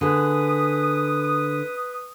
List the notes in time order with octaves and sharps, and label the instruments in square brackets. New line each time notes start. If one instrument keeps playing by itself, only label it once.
[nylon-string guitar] D3 G#4 [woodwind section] B4 D#6